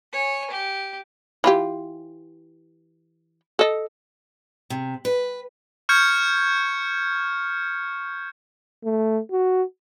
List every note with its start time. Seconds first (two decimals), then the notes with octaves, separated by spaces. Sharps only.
0.13 C#5 G#5
0.51 G4
1.44 E3 F4 G4
3.59 A4 D#5
4.70 C3
5.05 B4
5.89 C#6 F6 G6 G#6 C#7
8.85 A3
9.32 F#4